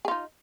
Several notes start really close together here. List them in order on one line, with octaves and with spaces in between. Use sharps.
G#4 F4 D#4